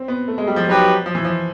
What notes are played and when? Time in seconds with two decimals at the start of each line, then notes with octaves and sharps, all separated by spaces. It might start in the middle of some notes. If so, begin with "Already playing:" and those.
Already playing: C4
0.08 B3
0.28 A3
0.38 G#3
0.47 G3
0.56 F3
0.67 F#3 B3 D#4 G4 B4
1.06 F3
1.15 E3
1.25 F3